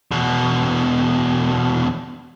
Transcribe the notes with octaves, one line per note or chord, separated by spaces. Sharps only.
E2 B2